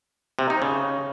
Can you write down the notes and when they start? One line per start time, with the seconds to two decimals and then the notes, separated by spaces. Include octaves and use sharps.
0.39 C3
0.50 D#4
0.62 C#3